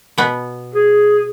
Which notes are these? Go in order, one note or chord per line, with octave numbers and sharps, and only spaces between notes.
B2 B3
G#4